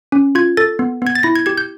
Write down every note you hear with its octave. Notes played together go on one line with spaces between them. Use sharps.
C#4
F4 G#6
A4 A6
B3
B3 G#6
A6
E4 A#6
G#6
G4 G#6
G6